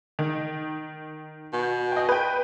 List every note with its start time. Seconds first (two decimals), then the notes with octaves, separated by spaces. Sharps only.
0.19 D#3
1.53 B2
1.92 D#5 G5
2.09 B4 G5